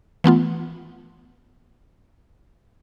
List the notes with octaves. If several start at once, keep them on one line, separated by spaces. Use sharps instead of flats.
E3 A3 B3 F4